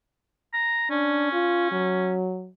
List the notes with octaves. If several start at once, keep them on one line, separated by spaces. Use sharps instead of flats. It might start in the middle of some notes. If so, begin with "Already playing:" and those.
A#5
C#4 D4
F4
F#3